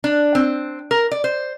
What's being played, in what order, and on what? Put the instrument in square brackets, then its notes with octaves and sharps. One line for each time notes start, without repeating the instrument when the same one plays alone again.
[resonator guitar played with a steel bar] D4
C4
A#4
D5
C5